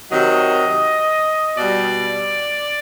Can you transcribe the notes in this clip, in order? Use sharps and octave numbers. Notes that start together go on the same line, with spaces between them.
C3 D#3 F#3 D#5
B2 G3 D5